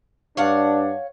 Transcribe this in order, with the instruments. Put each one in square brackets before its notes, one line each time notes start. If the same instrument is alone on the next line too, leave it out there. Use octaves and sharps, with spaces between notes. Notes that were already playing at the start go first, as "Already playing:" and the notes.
[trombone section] G2 D4 [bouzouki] C#5 F5 F#5